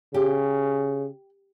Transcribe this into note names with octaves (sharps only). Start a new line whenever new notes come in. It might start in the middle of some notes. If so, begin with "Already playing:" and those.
C#3 G4